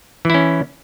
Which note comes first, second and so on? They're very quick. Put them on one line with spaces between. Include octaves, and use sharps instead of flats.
E3 E4 C#4